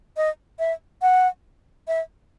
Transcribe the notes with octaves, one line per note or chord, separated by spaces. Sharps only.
D#5
E5
F#5
E5